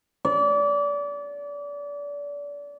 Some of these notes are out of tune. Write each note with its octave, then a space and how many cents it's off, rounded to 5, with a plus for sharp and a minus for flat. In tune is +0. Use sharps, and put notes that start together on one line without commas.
D5 -30